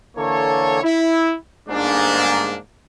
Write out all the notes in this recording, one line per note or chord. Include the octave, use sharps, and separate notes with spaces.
D3 E3 A#3 A4 C#5
E4
G1 G#2 A#3 D4